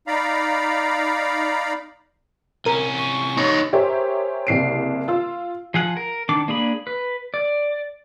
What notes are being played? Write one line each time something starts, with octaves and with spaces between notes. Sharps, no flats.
D#4 D5 F5 A#5 B5
C2 C#4 A#4 D#7
C#6
D#4 C#5
G4 G#4 A#4 C5 C#5 E5
F#1 C2 C7 D7
F4 E6
F3 G#4 F#5
A#4
D#3 D4 D6
A#3 D4 G#4 B5
B4
D5